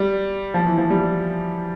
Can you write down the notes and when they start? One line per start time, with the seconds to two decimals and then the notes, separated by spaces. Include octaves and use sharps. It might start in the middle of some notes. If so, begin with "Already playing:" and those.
Already playing: G3
0.54 F3
0.66 E3
0.78 F3
0.90 G3